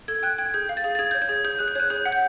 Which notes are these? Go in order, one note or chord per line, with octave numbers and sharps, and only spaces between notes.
A4 G#6
G5 F#6
G5 G#6
G#4 G6
F5
A6
G#4
A6
G#4 G#6
C#5 G6
G#6
G#4
G#4 G6
G#4 F#6
G6
C#5 F#6
G#4 G6
F#5
G6